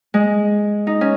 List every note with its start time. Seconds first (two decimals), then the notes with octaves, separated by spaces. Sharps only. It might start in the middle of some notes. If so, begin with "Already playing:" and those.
0.14 G#3
0.87 D#4
1.01 C#4